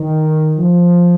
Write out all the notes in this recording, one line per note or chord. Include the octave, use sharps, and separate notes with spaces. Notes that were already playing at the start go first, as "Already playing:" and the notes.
Already playing: D#3
F3